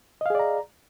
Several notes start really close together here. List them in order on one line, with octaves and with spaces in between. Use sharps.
D#5 F5 G#4 D5 A#5